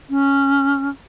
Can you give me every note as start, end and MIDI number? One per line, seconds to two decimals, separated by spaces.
0.10 0.90 61